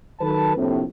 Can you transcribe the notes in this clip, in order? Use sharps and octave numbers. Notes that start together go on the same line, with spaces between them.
D#3 F#3 A4 B4 A5
A#1 A2 C3